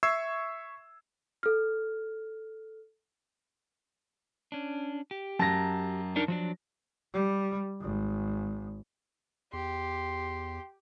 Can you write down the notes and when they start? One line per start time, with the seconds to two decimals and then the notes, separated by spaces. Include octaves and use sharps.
0.03 E5 C#6 E6 G#6 C7
1.43 A4 F6
4.52 C#4 D4
5.11 G4
5.39 F#2 A5 A#5 A#6
6.16 D4 D#4 A#4
6.28 F3 F#3 D4
7.13 G3
7.81 G#1
9.53 E2 G4 C6